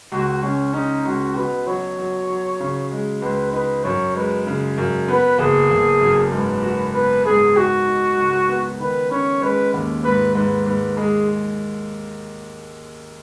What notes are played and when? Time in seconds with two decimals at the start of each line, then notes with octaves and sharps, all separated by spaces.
0.12 C#2 F#4
0.43 C#2 C#4
0.74 C#4 D#4
1.05 C#2 F#4
1.36 B2 B4
1.67 F#3 C#5
1.98 F#3
2.30 F#3
2.60 C#3
2.91 G#3
3.22 C#2 B4
3.53 D#4 B4
3.84 F#2 C#5
4.15 G#3 B4
4.47 C#3
4.78 F#2
5.08 B3 B4
5.39 F#1 G#4
5.71 F#1
6.01 F#2
6.32 G#2 B4
6.63 F#4
6.94 B3 B4
7.25 G#2 G#4
7.57 D#4 F#4
7.87 D#4
8.18 C#2
8.49 B3
8.80 D#3 B4
9.11 C#4 C#5
9.42 G#3 B4
9.74 D#2
10.04 G#2 B4
10.35 G#2 B4
10.66 G#2 B4
10.97 G#3 G#4